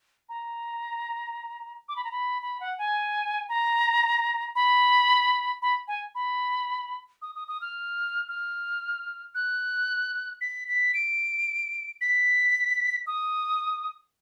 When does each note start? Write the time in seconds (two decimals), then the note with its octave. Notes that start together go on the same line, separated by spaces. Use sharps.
0.29 A#5
1.88 D6
1.96 B5
2.04 A#5
2.12 B5
2.42 B5
2.60 F#5
2.78 G#5
3.49 A#5
4.55 B5
5.62 B5
5.88 G#5
6.15 B5
7.22 D#6
7.35 D#6
7.48 D#6
7.61 F6
8.28 F6
9.35 F#6
10.41 B6
10.68 B6
10.94 D7
12.01 B6
13.07 D#6